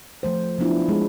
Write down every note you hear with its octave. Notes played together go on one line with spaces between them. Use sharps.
F3 A3 C5
F3 F#3 B3 D4 E4 F4
G#3 G#4